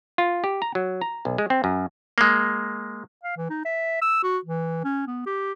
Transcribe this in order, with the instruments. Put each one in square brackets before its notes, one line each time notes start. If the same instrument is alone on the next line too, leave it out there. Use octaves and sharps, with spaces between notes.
[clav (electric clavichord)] F4
G4
A#5
F#3
A#5
B1
G#3
C4
F#2
G#3 A#3
[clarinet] F5
E3
D#4
E5
E6
F#4
E3
C#4
B3
G4